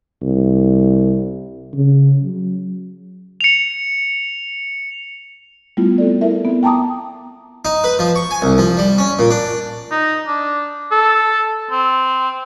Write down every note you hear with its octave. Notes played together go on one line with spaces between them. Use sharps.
C2
C#3
F#3
C#7 F7
G3 A3 B3 E4 F4
C4 A4 D5
E4 A#4 E5
B3 C4
G5 A5 A#5 D6 D#6
D#4
B4
F3
C#6
G#5
C2
F3
G3
C#4
A#2
D4
D#4
D4
A4
C4